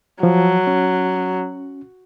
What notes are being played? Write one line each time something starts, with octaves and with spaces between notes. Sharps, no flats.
F3 F#3
C#4